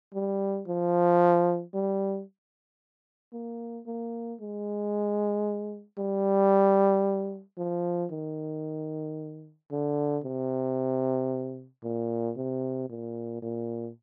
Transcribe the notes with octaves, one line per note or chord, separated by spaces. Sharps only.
G3
F3
G3
A#3
A#3
G#3
G3
F3
D#3
D3
C3
A#2
C3
A#2
A#2